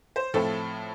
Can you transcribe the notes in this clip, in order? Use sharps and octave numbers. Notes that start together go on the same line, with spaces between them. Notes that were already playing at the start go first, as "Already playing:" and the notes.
C5
A2 F3 A3 C4 A4